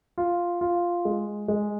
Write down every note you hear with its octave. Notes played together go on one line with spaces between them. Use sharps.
F4
F4
G#3
G#3